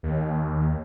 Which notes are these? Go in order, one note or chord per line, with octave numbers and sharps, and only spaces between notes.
D#2